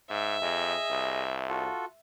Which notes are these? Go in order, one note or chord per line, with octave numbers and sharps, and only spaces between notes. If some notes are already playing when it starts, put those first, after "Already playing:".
G#2 E5
F2 G#4 D#5
C2
F4 F#4 A4